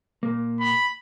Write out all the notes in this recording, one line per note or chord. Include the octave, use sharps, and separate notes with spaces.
A#2 A#3
B5